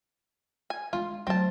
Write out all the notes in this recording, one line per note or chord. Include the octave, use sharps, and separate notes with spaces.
G#5
G#3 D4 F4
F#3 A3 C4 A5